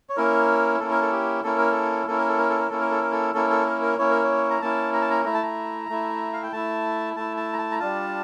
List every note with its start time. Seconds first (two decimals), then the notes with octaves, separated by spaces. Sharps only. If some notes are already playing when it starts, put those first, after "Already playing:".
0.10 C#5
0.16 A#3 C#4 E4 A#4
0.80 A#3 C#4 E4 A4
0.91 A#4
1.01 A4
1.12 G4
1.43 A#3 C#4 E4 A4
1.58 A#4
1.71 A4
2.07 A#3 C#4 E4 A4
2.18 A#4
2.28 A4
2.38 A#4
2.49 A4
2.59 A#4
2.70 A#3 C#4 E4 A4
2.81 A#4
2.91 A4
3.01 A#4
3.12 A4
3.34 A#3 C#4 E4 A4
3.50 A4
3.66 A#4
3.82 A#4
3.98 A#3 C#4 E4 C#5
4.11 A#4
4.23 C#5
4.50 A#5
4.62 A#3 C#4 E4 A5
4.93 A#5
5.01 A5
5.10 A#5
5.25 A3 E4 A#5
5.34 A5
5.42 A#5
5.89 A3 E4
6.33 F5
6.43 G5
6.52 A3 E4 A5
7.16 A3 E4 A5
7.37 A5
7.53 A#5
7.58 A5
7.72 A#5
7.80 G3 D4 F4 A5